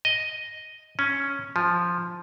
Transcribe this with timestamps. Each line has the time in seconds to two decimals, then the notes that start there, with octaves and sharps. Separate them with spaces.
0.05 D#5
0.99 C#4
1.56 F3